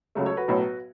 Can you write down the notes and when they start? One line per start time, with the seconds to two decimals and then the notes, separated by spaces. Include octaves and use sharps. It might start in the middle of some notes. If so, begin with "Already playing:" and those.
0.15 C#2 C#3 F#3 A3
0.26 A4 C#5
0.37 F#4 B4
0.48 B1 A2 F#3 B3